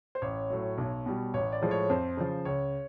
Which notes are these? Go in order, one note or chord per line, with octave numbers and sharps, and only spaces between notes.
C5
A1 C#5
A2 F#3
B1
B2 G3
A1 C#5
D5
A2 F3 G#3
C#5
F2 C5
C#3 F3
C#2 C#5